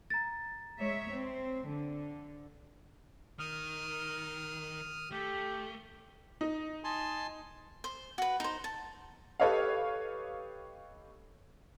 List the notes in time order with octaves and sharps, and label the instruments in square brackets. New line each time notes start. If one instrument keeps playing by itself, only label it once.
[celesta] A#5 A6
[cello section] G#3 C#5 E5
C4
D3
[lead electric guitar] D#3 [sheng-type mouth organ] D#6 F6
[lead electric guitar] A3 [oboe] G4
[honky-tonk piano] D#4
[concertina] G#5 A5 C6
[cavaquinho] C5
F#4 B4
D#4 C5
A5
[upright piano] G4 A4 B4 C#5 D#5 F5